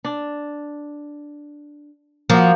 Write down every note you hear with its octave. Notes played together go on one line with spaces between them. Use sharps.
D4
F3 A#3 F#4